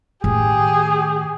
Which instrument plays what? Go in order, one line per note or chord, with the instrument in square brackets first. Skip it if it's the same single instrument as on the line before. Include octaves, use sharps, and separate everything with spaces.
[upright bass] A2 D#3 [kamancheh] G4 G#4